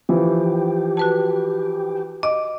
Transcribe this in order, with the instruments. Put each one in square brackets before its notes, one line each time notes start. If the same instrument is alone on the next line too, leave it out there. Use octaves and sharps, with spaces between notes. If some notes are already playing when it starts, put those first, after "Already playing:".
[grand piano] E3 F3 [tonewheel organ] G4
[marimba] F#4 B4 A5
[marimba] D#5 [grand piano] D6